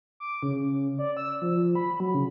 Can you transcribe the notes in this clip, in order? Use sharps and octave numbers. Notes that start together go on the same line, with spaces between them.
D6
C#3
D5
E6
F3
B5
F#3
C#3